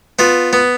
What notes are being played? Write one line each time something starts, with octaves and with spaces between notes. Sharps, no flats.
B3 F4
B3